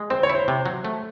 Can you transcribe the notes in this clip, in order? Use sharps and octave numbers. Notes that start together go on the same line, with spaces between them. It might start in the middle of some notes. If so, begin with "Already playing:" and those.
Already playing: G#3
C4 C5
C#5
E4
C5
C3
F#3
A3